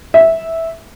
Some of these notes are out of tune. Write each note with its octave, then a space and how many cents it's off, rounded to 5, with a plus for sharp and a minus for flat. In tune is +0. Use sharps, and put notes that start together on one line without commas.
E5 -10